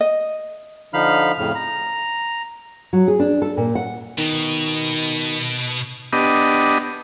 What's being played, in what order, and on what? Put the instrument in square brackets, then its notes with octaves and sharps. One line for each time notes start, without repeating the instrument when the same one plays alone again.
[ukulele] D#5
[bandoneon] D3 F3 D#4 F5 B5 F6
F2 A2 C#3 F6
A#5
[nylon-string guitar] F#3
G#4
D4
A4
A#2
F#5
[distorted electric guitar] B2 [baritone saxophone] D#3
[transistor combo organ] B3 D4 G4 D#5